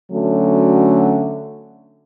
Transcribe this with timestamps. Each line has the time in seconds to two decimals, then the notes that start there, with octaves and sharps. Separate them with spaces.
0.12 D3 F#3 A3 C#4 F#4